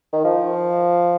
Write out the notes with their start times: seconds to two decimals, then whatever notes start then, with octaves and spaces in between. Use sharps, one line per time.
0.13 D#3
0.25 F3